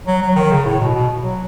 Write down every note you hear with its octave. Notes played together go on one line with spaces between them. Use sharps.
F#3
F#3
D#3
C#3
A2
B2
B2
F#3